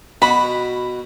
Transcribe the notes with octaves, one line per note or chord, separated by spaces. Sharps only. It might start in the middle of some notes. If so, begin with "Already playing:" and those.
B2 F#4 B5